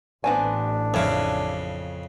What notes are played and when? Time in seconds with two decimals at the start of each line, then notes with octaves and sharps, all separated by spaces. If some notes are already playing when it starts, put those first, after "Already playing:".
0.24 A1 B3 C4 D4 G#5
0.94 F2 C#3 C#4 E4